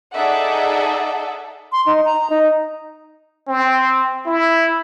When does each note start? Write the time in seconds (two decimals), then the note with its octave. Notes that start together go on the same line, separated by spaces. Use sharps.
0.14 D#4 G#4 A4 D5 E5 F#5
1.72 C6
1.86 D#4
2.05 A#5
2.30 D#4
3.48 C4
4.26 E4